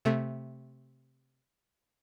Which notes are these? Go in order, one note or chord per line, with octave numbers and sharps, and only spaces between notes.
C3 A3